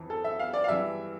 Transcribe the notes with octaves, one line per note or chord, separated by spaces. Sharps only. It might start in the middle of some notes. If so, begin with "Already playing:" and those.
Already playing: F2 E3
A4
E5
F5
D5
F5
G2 E3 E5